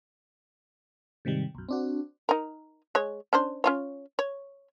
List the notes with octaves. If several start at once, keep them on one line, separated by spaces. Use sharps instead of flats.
G#2 C3 D#3 G3
B1 F#2
C4 D4 F#4
D#4 A#4
G#3 C#5
C#4 D4 C5
C#4 F4 C#5
C#5